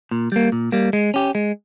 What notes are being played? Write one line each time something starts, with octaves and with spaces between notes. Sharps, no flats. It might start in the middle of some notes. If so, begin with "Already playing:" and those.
A#2
G3 A#3
A#2
G3 A#3
G#3
C#4 G4
G#3